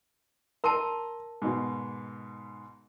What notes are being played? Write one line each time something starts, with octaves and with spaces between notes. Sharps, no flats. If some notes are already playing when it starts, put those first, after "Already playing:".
A#4 A5 A#5 C6
G#2 B2